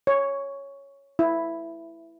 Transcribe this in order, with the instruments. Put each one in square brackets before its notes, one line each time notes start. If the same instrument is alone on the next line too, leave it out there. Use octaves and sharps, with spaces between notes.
[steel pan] C#5
E4